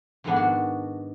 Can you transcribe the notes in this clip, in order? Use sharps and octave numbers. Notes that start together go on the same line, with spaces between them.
F2 G#2 D#3 G#3 B3 D4
F#4